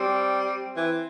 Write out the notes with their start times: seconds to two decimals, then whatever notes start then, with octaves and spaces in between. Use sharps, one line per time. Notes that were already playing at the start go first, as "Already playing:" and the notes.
Already playing: G3 C4
0.77 E3